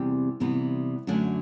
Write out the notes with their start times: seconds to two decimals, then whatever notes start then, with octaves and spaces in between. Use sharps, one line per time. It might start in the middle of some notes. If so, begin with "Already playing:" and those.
Already playing: E2 C3 G3 C4 G4
0.40 C3 E3 G3 B3
1.07 F#2 D3 F#3 A3